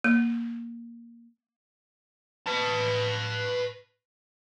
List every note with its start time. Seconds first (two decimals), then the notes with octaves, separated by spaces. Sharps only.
0.04 A#3
2.46 B4 A5